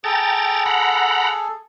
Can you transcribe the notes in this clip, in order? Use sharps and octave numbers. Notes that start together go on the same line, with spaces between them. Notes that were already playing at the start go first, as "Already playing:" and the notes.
G#4 A4 G5 A#5 A6
F#5 A#5 B5